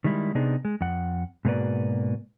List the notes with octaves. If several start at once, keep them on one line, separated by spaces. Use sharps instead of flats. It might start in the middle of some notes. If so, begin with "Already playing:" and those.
D#3 G3 G#3 E4
C3 B3 D4 D#4 G#4
G#3
F2 F#5
G#2 B2 A#3 F#4 B4 D5